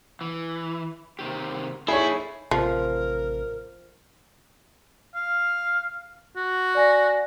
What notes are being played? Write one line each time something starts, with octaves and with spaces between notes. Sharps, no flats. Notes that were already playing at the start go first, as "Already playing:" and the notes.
E3
C3 D#3 G4
D#4 E4 G#4 A4 C#5
A1 C3 F3 A#4
F5
F#4
D5 G#5 A#6